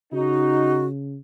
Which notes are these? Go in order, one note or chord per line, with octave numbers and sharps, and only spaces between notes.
C#3 D#4 F#4